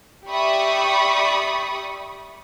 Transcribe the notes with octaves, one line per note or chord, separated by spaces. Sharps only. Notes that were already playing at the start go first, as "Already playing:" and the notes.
G4 D5 E5 B5 C#6 D#6